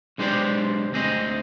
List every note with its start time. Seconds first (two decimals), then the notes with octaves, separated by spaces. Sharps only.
0.18 B1 G#3 D4 G4 C5 D5
0.92 D2 C4 G#4 D#5